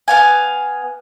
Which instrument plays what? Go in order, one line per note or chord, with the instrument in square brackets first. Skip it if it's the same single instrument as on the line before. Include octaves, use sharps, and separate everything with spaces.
[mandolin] B3 F5 G#5